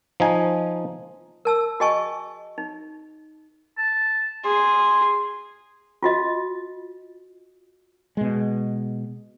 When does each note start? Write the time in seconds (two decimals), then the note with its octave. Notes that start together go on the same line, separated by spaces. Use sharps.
0.20 F3 D#4 G#5
1.45 A#4 A5 E6
1.80 F#4 G#4 D#5 G#5 A5 C#6
2.58 D#4
3.78 A5
4.45 G#4 C6
6.03 F4 F#4 D#5
8.17 B2 G#3